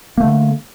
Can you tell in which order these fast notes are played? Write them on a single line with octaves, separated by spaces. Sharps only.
A#3 A3 D3